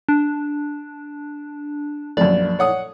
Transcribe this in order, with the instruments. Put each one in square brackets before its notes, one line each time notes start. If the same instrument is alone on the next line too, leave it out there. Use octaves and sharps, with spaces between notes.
[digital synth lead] D4
[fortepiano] A#1 F#2 [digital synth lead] D5
[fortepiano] C#5 F#5 D#6